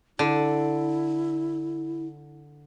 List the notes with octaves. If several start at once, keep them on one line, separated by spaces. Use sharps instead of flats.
D3 E4